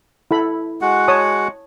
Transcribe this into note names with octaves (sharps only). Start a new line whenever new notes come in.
E4 A4 B5
G#3 F#4 F#5
C#5 A5 D#6